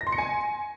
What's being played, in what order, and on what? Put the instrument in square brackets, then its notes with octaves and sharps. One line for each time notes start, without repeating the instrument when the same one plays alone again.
[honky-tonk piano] A#6
C6
C#7
G#5